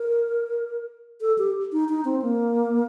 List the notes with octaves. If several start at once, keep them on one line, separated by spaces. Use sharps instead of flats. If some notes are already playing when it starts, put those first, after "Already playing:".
Already playing: A#4
A4
G4
D#4
D#4
C4
A#3